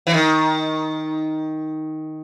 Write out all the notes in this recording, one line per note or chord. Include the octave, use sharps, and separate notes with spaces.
E3
D#3